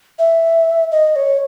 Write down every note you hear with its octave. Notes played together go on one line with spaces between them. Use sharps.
E5
D#5
C#5